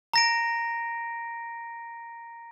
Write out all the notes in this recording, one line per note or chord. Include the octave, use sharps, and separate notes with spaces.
A#5 A#6 D7